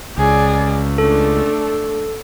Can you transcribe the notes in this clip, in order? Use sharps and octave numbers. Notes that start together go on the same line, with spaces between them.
C#2 G#4 D5
A3 D4 A4